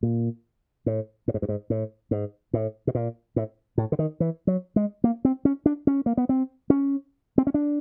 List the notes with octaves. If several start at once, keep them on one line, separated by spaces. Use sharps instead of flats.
A#2
A2
A2
G#2
G2
G#2
A2
G#2
A2
B2
A#2
A2
A2
D3
D#3
E3
F#3
G#3
A#3
C4
C#4
D4
C#4
A#3
B3
C4
C#4
C4
C#4
D4